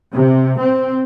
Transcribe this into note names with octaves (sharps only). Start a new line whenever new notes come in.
C3
C4